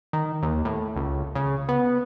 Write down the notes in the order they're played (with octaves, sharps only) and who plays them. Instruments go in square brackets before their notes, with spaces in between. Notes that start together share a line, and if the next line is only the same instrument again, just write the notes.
[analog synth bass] D#3
D#2
A2
C#2
C#3
B3